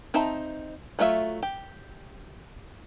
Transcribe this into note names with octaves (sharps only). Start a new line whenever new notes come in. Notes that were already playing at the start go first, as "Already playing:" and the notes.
C4 D#4 E5 A5 A#5
F#3 A3 F4 F#4 E5
G4